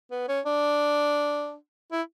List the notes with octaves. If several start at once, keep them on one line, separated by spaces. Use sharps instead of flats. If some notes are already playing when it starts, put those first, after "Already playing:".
B3
C#4
D4
E4